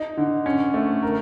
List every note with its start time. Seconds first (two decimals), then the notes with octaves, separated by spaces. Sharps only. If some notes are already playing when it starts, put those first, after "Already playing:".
Already playing: D#4
0.17 D3
0.46 C#4
0.74 A3
1.03 A#4